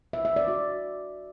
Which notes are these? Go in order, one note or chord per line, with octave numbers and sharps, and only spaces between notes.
E5
E5
D5
F#4